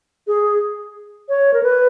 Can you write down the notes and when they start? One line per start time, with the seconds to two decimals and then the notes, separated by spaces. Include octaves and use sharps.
0.27 G#4
1.29 C#5
1.54 A#4
1.63 B4